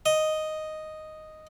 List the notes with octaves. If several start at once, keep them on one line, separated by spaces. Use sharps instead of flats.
D#5